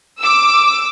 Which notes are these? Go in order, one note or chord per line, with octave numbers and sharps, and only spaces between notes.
D6 E6